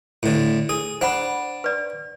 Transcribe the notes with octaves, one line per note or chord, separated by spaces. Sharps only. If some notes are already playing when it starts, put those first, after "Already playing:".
A2 D3
G#4 A4
D4 C5 F#5 B5
B4 D5